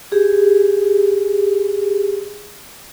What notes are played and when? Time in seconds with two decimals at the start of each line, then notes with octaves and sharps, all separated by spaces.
0.12 G4 G#4